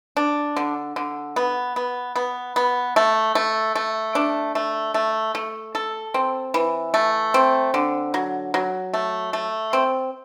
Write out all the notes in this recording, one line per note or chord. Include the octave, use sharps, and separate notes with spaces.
D4
D3
D3
B3
B3
B3
B3
A3
A3
A3
D4
A3
A3
A3
A4
C4
E3
A3
C4
D3
F#3
F#3
A3
A3
C4